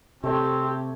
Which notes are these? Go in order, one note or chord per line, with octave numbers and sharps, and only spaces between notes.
C3 A3 C4 G4 C#5